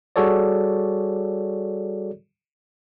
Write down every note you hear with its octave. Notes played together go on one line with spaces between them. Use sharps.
G3 F#4 G#4 A4 C#5 D5